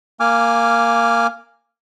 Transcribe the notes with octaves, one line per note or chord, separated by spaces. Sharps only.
A#3 G#5 D6 F6